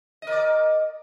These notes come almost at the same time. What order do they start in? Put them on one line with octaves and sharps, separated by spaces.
D#5 A#4 D5